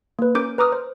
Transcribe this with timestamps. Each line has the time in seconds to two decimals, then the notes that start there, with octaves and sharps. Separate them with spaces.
0.19 A#3 B4
0.35 C#4 A#4 D6 G6 D7
0.58 B4 A#5 D6 D#6 F6
0.72 C5